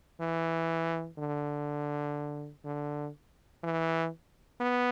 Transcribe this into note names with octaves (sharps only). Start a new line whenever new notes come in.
E3
D3
D3
E3
B3